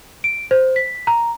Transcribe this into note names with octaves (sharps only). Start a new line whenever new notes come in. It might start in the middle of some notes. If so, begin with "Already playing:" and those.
D7
C5
B6
A#5